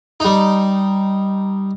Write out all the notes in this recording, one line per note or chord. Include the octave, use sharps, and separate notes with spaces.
G3 D#4